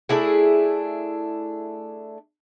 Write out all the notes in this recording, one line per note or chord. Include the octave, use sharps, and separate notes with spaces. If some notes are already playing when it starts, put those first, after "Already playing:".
A3 D4 E4 G#4